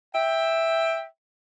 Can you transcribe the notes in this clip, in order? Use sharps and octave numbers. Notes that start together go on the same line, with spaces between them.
E5 G5